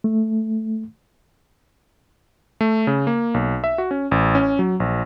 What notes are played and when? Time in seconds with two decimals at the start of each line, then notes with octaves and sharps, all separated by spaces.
0.04 A3
2.61 A3
2.87 C#3
3.07 A#3
3.34 B1
3.64 E5
3.78 F#4
3.91 C#4
4.11 A1
4.35 C#4
4.59 F#3
4.80 A#1